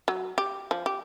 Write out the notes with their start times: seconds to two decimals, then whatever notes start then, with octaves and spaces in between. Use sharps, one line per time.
0.08 F#3
0.38 G4
0.71 F3
0.86 G4